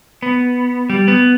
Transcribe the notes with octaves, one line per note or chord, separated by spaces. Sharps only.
B3
G3
B3